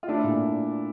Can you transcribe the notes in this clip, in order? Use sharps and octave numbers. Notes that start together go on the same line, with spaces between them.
F4
A3 D4 E4
A#2